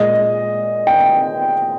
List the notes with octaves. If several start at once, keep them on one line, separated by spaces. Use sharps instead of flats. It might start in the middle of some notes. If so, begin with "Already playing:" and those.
Already playing: A#2 G#3 D#5
G5